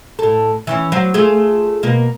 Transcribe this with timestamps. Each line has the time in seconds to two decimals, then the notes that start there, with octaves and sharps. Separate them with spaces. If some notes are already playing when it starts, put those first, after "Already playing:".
0.19 A2 A4
0.67 E3 C#4 E4
0.92 F#3 C5 F5
1.14 A3 F4 G#4
1.83 B2 A#3